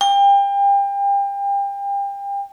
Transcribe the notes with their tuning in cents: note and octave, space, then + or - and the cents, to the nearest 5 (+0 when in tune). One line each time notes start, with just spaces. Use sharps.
G5 +30